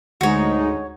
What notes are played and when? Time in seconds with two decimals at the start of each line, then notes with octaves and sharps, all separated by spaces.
0.21 D2 G#2 G#3 D#4 F#4 C#5